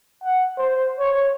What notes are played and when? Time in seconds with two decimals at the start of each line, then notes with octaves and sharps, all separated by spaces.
0.24 F#5
0.58 C5
0.99 C#5